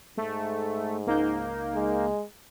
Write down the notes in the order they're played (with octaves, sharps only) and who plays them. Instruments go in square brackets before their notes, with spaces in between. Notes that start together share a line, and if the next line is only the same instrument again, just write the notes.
[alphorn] G#2 [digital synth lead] A3
[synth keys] C#2 D#4 G6 [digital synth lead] A#3
[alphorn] G#3